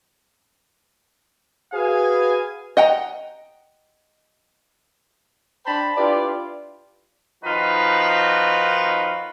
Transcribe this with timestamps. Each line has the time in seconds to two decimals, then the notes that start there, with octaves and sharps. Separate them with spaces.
1.73 F#4 G#4 B4 F5 G#5
2.77 D#5 F#5 G5 A#5
5.66 D4 C5 G5 A5 B5
5.96 D4 E4 F4 G4 B4 D5
7.44 D#3 F3 D#4 F4 F#4 B4